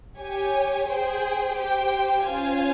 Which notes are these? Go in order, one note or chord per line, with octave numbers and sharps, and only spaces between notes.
G4 C#5 G#5
G#4 C5 G5
G4 C5 G5
C#4 F4 C5 F5 G#5